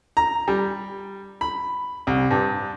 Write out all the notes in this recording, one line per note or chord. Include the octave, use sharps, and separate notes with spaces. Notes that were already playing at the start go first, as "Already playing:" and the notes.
A#5
G3
B5
C2
G2